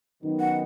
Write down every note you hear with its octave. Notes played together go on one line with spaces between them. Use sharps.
F#2 D#3 B3 D#4
F#5